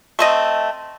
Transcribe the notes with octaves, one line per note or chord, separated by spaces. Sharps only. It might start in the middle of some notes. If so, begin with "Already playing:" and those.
A3 C4 D#5